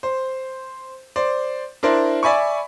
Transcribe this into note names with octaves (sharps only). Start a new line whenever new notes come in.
C5
C5 D5
D4 E4 A#4 C5 D5
D5 E5 G#5 B5 C#6